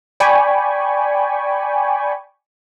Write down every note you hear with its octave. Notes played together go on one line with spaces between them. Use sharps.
D5 G5 G#5 B5 C#6